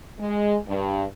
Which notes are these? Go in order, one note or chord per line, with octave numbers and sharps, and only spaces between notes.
G#3
G2